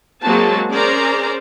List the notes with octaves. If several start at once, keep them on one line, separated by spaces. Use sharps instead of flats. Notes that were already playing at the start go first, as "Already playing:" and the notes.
F#3 G#3 A#3 C4 F#4 A5
C#4 G#4 A#4 C5 D5 A#5